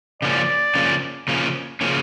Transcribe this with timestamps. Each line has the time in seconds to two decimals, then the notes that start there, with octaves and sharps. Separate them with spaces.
0.22 C#3 F3 A#3 C#4 D5
0.75 C#3 F3 A#3 C#4
1.28 C#3 F3 A#3 C#4
1.81 C#3 F3 A#3 C#4